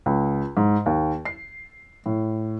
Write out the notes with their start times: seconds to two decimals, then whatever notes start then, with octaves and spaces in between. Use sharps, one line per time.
0.06 C#2
0.57 G#2
0.86 D#2
1.25 C7
2.06 A2